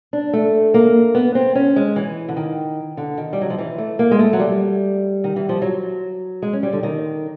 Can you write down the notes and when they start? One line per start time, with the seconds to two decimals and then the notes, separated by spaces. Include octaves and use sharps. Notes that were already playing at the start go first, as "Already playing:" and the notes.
0.13 D4
0.33 A3
0.74 A#3
1.15 B3
1.35 C4
1.55 C#4
1.76 G#3
1.96 E3
2.28 D3
2.36 D#3
2.97 D3
3.18 D#3
3.33 G3
3.41 F#3
3.50 F3
3.59 E3
3.78 A3
3.99 A#3
4.11 G#3
4.19 A3
4.33 F#3
4.40 G3
5.24 D#3
5.36 E3
5.49 F3
5.62 F#3
6.42 G#3
6.53 C#4
6.63 G3
6.73 D3
6.83 D#3